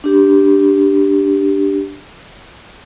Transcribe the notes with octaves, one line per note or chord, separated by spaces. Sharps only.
D4 G4